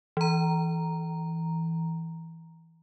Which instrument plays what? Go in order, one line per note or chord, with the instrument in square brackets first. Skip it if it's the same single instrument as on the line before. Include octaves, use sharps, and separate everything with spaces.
[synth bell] E3 A#5